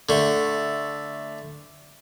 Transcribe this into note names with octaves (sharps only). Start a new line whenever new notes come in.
D3 A3